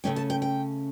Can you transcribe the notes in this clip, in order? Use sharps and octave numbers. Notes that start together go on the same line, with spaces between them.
C#3 F3 A3 C#4 G5
A5
G5
G5